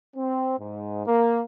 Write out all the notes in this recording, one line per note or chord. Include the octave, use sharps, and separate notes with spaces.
C4
G#2
A#3